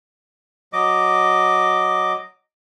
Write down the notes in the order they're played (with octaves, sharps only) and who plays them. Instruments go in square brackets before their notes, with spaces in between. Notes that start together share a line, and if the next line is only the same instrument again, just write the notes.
[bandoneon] F#3 D#5 D6